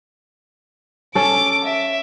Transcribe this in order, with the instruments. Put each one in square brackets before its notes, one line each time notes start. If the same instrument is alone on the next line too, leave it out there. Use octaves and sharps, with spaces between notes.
[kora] C#4 A4 [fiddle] D6
[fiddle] E5